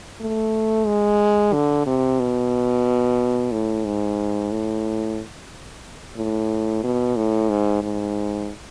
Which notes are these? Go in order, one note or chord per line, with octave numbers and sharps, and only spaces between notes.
A3
G#3
D3
C3
B2
A2
G#2
A2
A2
B2
A2
G#2
G#2